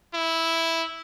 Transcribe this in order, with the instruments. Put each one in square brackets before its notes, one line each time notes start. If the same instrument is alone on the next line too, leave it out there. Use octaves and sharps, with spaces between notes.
[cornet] E4